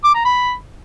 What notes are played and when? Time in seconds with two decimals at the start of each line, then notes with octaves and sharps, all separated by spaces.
0.04 D6
0.14 A#5
0.25 B5